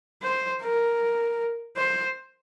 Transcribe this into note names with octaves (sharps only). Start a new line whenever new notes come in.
C5
A#4
C5